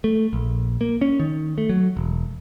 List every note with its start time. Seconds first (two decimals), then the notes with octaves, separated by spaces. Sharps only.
0.04 A3
0.33 A#1
0.81 A#3
1.01 C#4
1.19 D#3
1.58 A3
1.69 F#3
1.97 E1